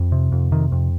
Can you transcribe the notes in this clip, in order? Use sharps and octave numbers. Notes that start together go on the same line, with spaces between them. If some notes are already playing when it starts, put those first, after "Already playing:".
Already playing: F2
C3
F2
C3 D#3
F2